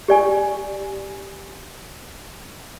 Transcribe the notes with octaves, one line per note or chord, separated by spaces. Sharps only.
G4 D5 G#5